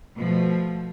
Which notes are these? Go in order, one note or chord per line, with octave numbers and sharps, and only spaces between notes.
B2 F3 A3